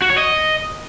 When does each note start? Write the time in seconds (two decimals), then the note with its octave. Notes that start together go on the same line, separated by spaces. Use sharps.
0.02 F#4
0.10 C#5
0.18 D#5